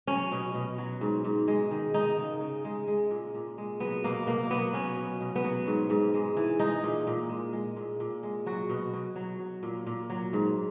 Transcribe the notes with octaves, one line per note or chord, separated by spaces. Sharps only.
F#3 C#4
B2
B2
F#3
G#2
G#2
G#3
D#3
G#3 D#4
C#3
C#3
G#3
G#3
A#2
A#2
G#3
F#3 B3
B2 A#3
B2 A#3
F#3 B3
F#3 C#4
B2
B2
B3
F#3
G#2
G#2
G#3
E3
G#3 D#4
A#2
A#2
G#3
G#3
A#2
A#2
G#3
F#3 F#4
B2
B2
F#3
F#3
A#2
A#2
F#3
G#2